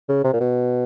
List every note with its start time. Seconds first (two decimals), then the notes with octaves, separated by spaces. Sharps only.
0.09 C#3
0.24 C3
0.33 A#2
0.40 B2